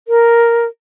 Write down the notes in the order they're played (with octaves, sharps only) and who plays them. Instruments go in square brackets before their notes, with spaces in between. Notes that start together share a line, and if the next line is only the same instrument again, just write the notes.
[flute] A#4